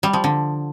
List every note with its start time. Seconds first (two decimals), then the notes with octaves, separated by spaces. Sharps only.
0.03 G3
0.13 F3
0.24 D3